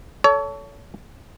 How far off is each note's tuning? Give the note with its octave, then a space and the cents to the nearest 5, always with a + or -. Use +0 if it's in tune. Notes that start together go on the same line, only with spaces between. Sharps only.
A4 +0 C#5 +30